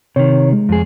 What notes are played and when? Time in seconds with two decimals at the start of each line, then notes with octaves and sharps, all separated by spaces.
0.16 C3 D#3 C#5
0.53 G#3
0.69 F2 G#4